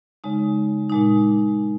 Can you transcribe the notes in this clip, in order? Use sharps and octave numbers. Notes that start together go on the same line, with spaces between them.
C#3 G#3 D#4
A#2 G#3 D#4